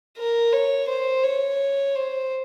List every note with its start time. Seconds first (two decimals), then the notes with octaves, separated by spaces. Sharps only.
0.17 A#4
0.53 C#5
0.88 C5
1.24 C#5
1.95 C5